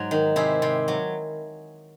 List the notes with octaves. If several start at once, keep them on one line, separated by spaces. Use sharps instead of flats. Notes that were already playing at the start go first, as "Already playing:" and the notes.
Already playing: G#2 F#3
D#3
C3 E4 G#4
C3
F#3